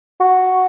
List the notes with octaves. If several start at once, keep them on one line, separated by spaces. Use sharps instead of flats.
F#4